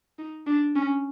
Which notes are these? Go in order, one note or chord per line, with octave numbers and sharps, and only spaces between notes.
D#4
D4
C#4